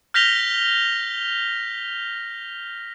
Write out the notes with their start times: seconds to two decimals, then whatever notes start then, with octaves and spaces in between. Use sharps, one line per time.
0.14 F6 G6 A#6 B6 F7 G7